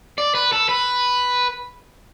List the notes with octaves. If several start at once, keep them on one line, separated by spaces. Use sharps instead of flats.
D5
B4
A4
B4